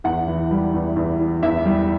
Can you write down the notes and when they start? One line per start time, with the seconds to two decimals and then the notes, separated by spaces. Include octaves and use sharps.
0.04 E2 F#5
0.28 E3
0.51 G3
0.74 E2
0.96 E2
1.19 E3
1.43 E2 E5
1.65 G3